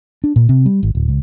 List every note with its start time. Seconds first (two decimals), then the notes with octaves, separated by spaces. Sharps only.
0.24 D4
0.36 A#2
0.49 C3
0.66 G3
0.83 G#1
0.95 D1
1.08 C#2